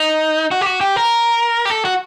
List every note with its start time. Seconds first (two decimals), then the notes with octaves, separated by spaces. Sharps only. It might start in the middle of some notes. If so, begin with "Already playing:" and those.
Already playing: D#4
0.51 F#4
0.61 G4
0.66 F#4
0.81 G4
0.96 A#4
1.65 G4
1.70 A4
1.85 F#4